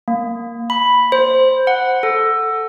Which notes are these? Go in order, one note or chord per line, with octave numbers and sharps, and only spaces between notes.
A#3
B5
C5
F#5
A4